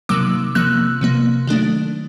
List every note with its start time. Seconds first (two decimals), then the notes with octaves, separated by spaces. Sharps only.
0.09 C3 D#3 F#3 A#3 D6 E6
0.55 C3 F3 A#3 E6 F#6
1.01 C3 F3 A#3
1.47 D#3 F#3 A3 D4